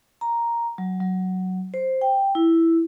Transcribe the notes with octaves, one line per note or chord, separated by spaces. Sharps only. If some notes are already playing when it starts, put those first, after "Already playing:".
A#5
F#3
F#3
C5
G5
E4